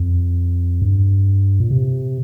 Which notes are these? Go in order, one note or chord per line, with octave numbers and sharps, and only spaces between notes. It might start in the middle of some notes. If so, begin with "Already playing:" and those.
Already playing: F2
G2
A#2
C3